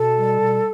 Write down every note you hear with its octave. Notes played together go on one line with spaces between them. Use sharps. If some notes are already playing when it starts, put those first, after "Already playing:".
Already playing: B2 A4
G3
B2